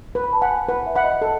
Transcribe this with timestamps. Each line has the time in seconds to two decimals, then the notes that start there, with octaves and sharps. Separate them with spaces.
0.15 B4
0.24 B5
0.33 A5
0.41 F#5 G#5 B5
0.68 B4 F#5
0.86 E5
0.95 F#5 B5
1.03 D#5
1.22 A4